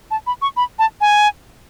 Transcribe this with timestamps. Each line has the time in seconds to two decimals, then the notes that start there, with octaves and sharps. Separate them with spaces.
0.11 A5
0.27 B5
0.42 C#6
0.57 B5
0.79 A5
1.01 G#5